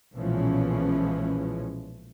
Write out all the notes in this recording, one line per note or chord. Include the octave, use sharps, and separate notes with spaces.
B1 A#2 E3 F3 G#3 C#4